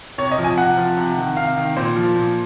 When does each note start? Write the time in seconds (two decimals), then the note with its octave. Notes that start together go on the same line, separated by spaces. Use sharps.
0.18 C3 C#5
0.32 D#5
0.38 F3
0.44 G#5
0.57 C3 F#5
0.77 F3
0.97 C3
1.18 D#3
1.37 C3 F5
1.56 D#3
1.76 A#2 C5
1.96 F3
2.16 A#2